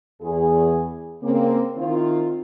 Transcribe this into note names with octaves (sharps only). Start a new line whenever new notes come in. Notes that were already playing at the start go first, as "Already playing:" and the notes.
E2 G#4
C#3 A#3 C4
D#3 C4 E4 F4